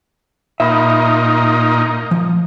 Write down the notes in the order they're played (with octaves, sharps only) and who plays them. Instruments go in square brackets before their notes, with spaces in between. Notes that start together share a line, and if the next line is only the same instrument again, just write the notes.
[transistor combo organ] A#2 D#4 [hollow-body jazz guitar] E5 B5
[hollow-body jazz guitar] F3